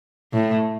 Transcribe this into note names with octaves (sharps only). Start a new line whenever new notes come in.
A2